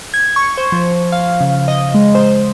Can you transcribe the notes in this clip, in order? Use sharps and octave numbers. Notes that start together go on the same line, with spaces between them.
G#6
C#6
C5
F3
F5
C#3
D#5
G#3
C5